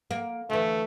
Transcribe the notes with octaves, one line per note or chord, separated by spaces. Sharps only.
A#3
D2 E3 A3